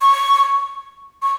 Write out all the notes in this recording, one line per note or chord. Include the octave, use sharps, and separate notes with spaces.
C#6
C#6